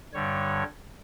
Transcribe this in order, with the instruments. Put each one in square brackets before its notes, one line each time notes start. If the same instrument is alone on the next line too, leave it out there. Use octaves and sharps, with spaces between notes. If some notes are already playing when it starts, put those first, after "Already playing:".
[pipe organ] G2 D3 G3 C#5